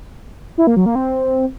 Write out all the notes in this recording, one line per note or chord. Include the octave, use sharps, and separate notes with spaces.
E4
A#3
F#3
A#3
C4